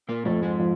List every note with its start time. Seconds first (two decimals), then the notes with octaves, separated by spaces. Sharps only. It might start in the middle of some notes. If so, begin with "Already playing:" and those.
0.09 A#2 A#3
0.25 F2 A2 A3
0.42 G#2 G#3
0.59 F3